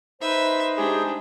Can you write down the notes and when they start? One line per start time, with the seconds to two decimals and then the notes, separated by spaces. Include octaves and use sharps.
0.21 D#4 B4 C5 E5
0.77 G#3 D4 G4 G#4